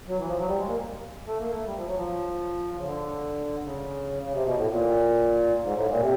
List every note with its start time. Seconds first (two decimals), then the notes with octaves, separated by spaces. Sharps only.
0.08 F#3
0.18 E3
0.28 F3
0.38 F#3
0.48 G3
0.58 G#3
0.67 A#3
1.26 A3
1.40 A#3
1.53 A3
1.66 G3
1.76 F3
1.86 F#3
1.96 F3
2.77 C#3
2.85 D3
3.64 C#3
4.23 C#3
4.33 C3
4.44 B2
4.56 A2
4.70 A#2
5.62 G#2
5.75 A2
5.89 A#2
5.96 B2
6.01 C3